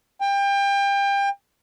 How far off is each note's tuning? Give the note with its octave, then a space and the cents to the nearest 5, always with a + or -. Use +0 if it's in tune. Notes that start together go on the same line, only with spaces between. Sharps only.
G5 +30